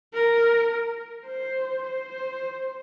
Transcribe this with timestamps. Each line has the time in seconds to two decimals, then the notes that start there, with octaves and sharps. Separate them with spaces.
0.14 A#4
1.26 C5
1.83 C5